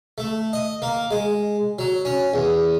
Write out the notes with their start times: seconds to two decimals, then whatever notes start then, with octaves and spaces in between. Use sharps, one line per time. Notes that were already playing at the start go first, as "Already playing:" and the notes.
0.18 A3
0.53 D#5
0.82 A#3
1.11 G#3
1.79 F#3
2.05 C#4
2.34 E2